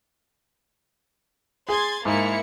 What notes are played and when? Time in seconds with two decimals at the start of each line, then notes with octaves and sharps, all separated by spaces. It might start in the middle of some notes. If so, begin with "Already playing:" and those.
1.69 G#4 C6 G#6 A6
2.05 G#2 A#3 E4 C#7